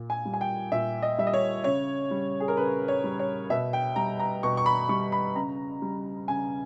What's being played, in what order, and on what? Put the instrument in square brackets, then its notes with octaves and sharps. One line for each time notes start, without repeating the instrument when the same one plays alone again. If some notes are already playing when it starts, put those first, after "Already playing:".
Already playing: [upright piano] A#2
G#5
G3
G#5
G5
A#2 E5
D#5
G3 E5
D#5
C#5
C#3 C#5
G3
G#4
A#4
C#3 B4
C#5
G3
C#5
B2 E5
G5
G3 A#5
A#5
B2 C#6
C#6
B5
G3 C#6
B5
C#3 A#5
G3
C#3 G#5